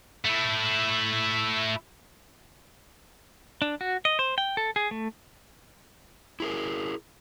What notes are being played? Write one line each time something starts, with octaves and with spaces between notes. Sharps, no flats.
A3 E4
D4
F#4
D#5
C5
G5
A4
G#4
A3
E4 G#4 A#4